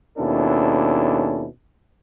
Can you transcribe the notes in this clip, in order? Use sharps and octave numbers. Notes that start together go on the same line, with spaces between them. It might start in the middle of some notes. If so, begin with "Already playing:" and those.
D#2 B2 C#4 D4 E4 A4